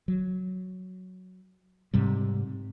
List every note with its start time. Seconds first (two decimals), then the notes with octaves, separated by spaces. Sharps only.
0.08 F#3
1.94 G#2 C3 G3